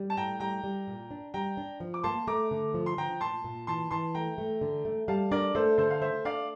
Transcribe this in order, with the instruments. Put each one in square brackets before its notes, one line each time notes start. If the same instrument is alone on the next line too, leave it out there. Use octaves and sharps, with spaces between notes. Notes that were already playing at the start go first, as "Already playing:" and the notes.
Already playing: [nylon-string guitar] G3
[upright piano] A5
[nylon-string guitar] A2 [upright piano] G5 A#5
[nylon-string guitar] G3 [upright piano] G5 A#5
[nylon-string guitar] G3
A#2
D4
[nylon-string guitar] G3 [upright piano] G5 A#5
[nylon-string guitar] D4
F3
[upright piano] D6
[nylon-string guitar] A#3 [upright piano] A5 C6
[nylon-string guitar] A3 [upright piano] A#5 D6
[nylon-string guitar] D3
F3
[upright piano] C6
[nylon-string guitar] F3 [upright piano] G5 A#5
[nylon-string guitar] A#2 [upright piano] A5 C6
[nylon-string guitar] A#2
[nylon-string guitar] E3 [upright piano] A5 C6
[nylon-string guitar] E3 [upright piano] A5 C6
[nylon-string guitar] A3 [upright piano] G5 A#5
[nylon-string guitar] A3
D3
A3
[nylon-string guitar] G3 [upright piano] F5 A5
[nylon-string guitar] D4 [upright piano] A#4 D5
[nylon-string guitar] A3 [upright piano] A4 C5
[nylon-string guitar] D3 [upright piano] A4 C5
[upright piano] F5
[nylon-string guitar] A3 [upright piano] C5 E5
[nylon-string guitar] D4 [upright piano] D5 F5